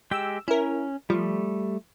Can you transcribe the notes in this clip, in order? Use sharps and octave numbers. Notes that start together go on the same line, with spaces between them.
G#3 G4 G5 E6
C#4 E4 A#4
F3 G3 A3